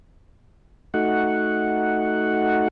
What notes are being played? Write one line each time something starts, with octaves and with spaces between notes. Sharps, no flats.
A3 D#4 F#4 F#5